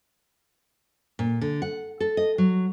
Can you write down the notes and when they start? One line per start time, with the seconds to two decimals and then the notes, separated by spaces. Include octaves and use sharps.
1.19 A#2
1.41 D3
1.62 F#5
2.00 A4
2.17 D#5
2.38 F#3